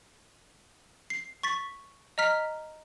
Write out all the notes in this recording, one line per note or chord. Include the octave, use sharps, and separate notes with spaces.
C7
C#6 A6 B6
D#5 A#5 F6 B6